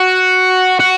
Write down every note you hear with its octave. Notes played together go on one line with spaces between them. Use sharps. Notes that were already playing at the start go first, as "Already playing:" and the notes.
Already playing: F#4
F#4